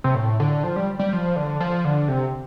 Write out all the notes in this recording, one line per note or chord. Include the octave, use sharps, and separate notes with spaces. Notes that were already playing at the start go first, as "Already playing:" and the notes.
C3
A2
D3
F3
G3
G3
F3
D3
F3
D3
C3